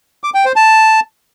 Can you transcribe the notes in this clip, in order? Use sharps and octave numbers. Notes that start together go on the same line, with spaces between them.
D6
G5
C5
A5